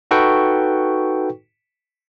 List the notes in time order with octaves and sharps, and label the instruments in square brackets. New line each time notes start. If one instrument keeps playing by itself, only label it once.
[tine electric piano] D#4 F#4 A4 B4 G5 C#6